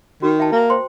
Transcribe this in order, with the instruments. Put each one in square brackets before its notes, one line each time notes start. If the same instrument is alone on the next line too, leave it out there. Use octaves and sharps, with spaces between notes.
[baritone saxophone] D#3 [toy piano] F#4
[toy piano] E5 G5 A5
[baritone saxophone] A#3
[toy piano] C5 G5 C6